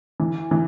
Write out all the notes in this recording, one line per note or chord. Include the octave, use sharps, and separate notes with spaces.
E3
E3